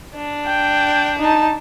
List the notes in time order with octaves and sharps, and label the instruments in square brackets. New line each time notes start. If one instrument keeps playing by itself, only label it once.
[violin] D4
[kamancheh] G5
D#4 A5